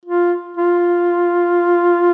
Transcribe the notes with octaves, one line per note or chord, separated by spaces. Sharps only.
F4
F4